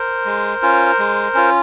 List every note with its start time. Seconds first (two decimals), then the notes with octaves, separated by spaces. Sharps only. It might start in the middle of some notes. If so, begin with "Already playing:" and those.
Already playing: A#4 C5
0.25 G#3
0.63 C#4 F4
0.99 G#3
1.35 C#4 F4